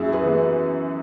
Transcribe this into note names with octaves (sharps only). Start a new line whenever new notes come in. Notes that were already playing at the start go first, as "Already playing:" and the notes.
Already playing: F#2 E4 G#4
G#4 B4
E3 B3